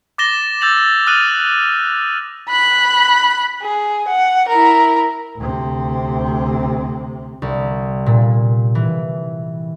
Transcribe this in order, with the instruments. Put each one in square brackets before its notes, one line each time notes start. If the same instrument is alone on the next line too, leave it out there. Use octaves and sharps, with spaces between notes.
[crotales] D6 A6 A#6 E7 G7
E6 G6 A6 F7 F#7
D#6 F6 F#6 D#7 F7 F#7
F#7
[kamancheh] B5 F#6
G#4
F#5
E4 A#4
[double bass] D2 C3
[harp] C2
A#2
E3